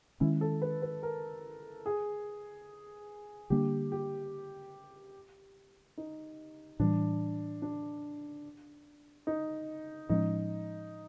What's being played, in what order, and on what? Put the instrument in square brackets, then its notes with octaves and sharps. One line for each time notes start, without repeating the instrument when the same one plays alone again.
[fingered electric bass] D#3 G#3 C#4 [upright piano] E4
[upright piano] A4
B4
B4
A#4
G#4
[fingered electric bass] D3 G3 A#3 D4 [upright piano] G4
[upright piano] G4
D#4
[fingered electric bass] A2 E3 G3 [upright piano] D4
[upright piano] D4
D#4
[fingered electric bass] A2 F3 G#3 C#4 [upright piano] D#4